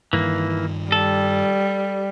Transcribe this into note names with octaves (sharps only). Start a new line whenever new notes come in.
G2 D#3 E3 A#3
G3 A4